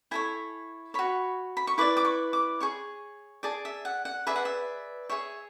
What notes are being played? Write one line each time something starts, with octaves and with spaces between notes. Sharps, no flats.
E4 A4 C#5 G#5
F#4 C#5 B5
B5
C#6
E4 B4 D5 D6
D6
C#6
D6
G#4 C#5 C#6
G#4 D5 A5
E5
F#5
F#5
G#4 B4 D5 E5
F#5
E5
G#4 C#5 E5